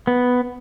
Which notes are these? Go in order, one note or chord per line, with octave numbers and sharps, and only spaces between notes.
B3